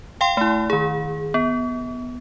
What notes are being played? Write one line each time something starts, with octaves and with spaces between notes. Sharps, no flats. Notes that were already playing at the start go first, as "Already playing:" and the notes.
F5 G5 C6
A3 E4
D#3 G#4
B3